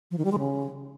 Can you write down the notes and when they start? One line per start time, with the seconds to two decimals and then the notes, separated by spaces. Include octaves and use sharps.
0.11 F3
0.18 D#3
0.25 G3
0.32 G#3
0.39 C#3